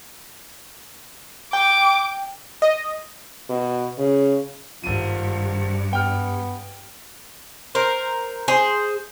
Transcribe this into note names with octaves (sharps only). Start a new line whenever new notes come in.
G5 D6
D#5
B2
C#3
G#1 G2 F4 D#7
B3 G5 F6
A#4 C5
G#4 C5